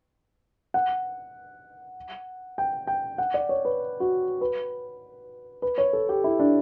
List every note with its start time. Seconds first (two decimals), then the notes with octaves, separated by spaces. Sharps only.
0.74 F#5
2.58 G5
2.87 G5
3.18 F#5
3.34 D5
3.49 C#5
3.65 B4
4.00 F#4
4.41 B4
5.62 B4
5.78 C#5
5.93 A4
6.09 G4
6.24 E4
6.40 D4